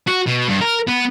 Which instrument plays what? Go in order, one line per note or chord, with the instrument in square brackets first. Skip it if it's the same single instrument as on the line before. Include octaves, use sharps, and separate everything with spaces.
[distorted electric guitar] F#4
B2
G2
A#4
B3